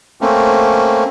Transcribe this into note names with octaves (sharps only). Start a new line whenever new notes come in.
A3 A#3 C4 C#4